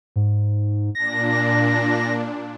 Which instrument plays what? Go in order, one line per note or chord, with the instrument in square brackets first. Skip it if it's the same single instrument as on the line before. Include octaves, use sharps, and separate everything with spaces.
[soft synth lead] G#2
[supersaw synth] A#2 D4 [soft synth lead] A#6